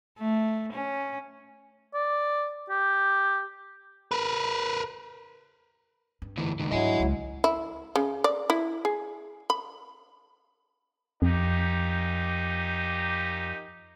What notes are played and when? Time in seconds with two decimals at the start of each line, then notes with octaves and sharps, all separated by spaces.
0.19 A3
0.73 C#4
1.94 D5
2.70 G4
4.12 A#4 B4
6.22 G2
6.37 D2 E3
6.60 C#2 D#3
6.71 G#2 F#3 D4 E4 D#5 G#5
7.00 C#2 G#3
7.44 E4
7.96 C#3
8.24 D5
8.50 E4
8.85 G#4
9.50 B5
11.22 F2 A#2 D#4 G4